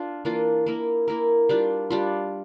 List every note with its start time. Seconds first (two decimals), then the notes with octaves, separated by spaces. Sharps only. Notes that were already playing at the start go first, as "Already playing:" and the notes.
Already playing: D4 F4
0.25 E3 A#3 D4 F4
0.66 A#3 E4 A#4
1.08 A#3 E4 A#4
1.49 G3 D4 F4
1.90 G3 D4 F4